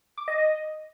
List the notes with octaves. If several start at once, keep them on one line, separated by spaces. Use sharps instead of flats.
D6
D#5
D#5